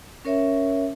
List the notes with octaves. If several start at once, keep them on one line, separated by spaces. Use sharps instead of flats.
C#4 A#4 C#5 E5